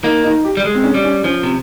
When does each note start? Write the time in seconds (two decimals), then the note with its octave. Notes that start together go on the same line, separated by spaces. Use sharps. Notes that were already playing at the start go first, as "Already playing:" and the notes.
0.03 A#3 D#4
0.24 D#4
0.45 G4
0.57 G3
0.65 G#3
0.75 C4
0.84 C#4
0.94 G3
1.04 C#4
1.24 F3 C#4
1.43 C3